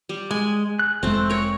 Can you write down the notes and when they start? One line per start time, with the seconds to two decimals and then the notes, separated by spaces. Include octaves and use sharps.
0.09 G3
0.31 G#3 G#5
0.79 F#6
1.03 F1 G#3 A3 C4
1.30 A#4 C#5